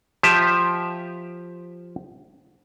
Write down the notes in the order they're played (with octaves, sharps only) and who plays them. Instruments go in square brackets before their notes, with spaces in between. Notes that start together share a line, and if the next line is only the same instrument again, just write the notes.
[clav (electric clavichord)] F3 G4 E5